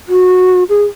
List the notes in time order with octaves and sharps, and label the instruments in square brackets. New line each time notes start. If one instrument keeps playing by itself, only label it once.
[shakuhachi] F#4
G#4